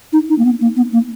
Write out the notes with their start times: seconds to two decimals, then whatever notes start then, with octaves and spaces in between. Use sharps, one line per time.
0.13 D#4
0.29 D#4
0.38 A#3
0.45 B3
0.61 A#3
0.76 B3
0.93 A#3